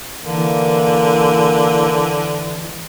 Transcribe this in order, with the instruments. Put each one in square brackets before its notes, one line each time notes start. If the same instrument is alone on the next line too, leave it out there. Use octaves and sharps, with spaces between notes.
[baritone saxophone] D3 [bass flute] E3 [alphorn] A#3